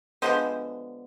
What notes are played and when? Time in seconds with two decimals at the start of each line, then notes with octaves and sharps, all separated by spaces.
0.22 D3 F3 G#3 B3 C5